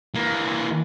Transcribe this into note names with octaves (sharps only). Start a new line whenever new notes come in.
E3 A#3